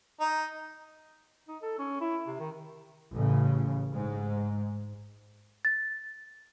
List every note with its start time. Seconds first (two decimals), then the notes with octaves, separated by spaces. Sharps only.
0.20 D#4
1.48 D#4
1.62 A4
1.78 C#4
2.01 E4
2.27 C3
2.40 D#3
3.14 A1 C#3
3.94 G#2
5.65 A6